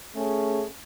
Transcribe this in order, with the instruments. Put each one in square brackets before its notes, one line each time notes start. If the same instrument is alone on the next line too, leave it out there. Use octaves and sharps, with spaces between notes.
[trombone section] A3 C#4 G#4